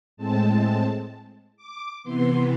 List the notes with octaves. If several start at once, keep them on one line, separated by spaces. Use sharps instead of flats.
A2 G#3 C4 A5
D6
C3 E3 B3 C6